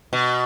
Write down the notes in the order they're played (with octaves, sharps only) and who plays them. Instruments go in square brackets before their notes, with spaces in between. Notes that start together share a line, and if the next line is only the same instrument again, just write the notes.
[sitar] B2